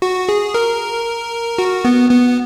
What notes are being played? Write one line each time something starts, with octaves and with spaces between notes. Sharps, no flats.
F#4
G#4
A#4
F#4
B3
B3